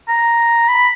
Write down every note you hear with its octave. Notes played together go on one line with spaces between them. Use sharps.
A#5
B5